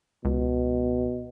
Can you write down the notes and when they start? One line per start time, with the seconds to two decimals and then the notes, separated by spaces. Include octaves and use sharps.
0.25 C#2 B2